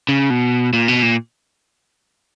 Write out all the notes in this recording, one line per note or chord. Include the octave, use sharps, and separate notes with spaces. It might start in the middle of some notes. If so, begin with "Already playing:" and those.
C#3
B2
A#2
B2
A#2